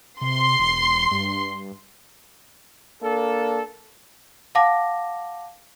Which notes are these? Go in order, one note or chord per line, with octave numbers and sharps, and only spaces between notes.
C3 C6
E1
G2
A#3 D4 A4
F5 F#5 A5 D6 A#6